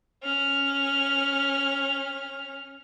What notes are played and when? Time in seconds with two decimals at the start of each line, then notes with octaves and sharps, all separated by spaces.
0.24 C#4 F6